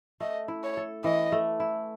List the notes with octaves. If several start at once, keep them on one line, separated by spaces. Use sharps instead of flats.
A3 D#5
E4
C#5
A4
E3 D#5
A3
E4